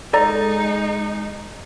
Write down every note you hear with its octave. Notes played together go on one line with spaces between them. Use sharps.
G#3 D#4 A4 D5 A#5